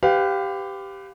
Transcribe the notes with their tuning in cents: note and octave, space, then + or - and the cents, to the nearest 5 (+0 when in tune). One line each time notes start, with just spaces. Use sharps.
G4 +0 B4 +35 F5 +15